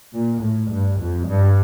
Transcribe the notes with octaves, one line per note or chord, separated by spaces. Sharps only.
A#2
A2
G2
F2
G2